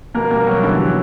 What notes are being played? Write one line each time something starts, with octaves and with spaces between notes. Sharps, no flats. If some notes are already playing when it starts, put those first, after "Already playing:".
B2 A#3 A#4
G3 A#3 A#4
B2 F#3 F#4
D3 E3 E4
F#3 F#4